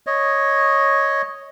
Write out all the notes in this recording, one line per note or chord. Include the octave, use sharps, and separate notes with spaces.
C#5 D#5